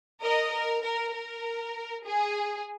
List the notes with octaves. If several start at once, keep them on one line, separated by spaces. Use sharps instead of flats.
A#4 D#5
A#4
A#4
A#4
G#4